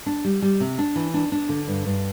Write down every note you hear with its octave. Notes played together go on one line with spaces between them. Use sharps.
D4
G3
G3
C3
D4
E3
D4
D4
D3
G2
G2